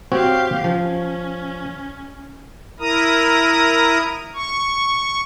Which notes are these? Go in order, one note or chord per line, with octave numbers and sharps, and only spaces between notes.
C4 F#4 G4 C#5 F5
F3 C#4
E4 A#4 A#5 D#6
C#6